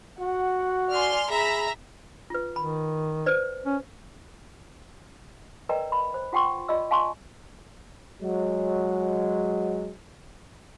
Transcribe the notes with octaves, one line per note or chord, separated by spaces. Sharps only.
F#4 F#5
D5 G#5 C6 F6
G#4 E5 A#5 B5
F4 B4
D#3 B5
B4 C5 D5
C#4
A#4 B4 D5 D#5 G5 A#5
B5
C5
F4 F#5 G5 C6 C#6
F4 D5 D#5 E6
F5 G#5 A5 C6 C#6
F#3 G#3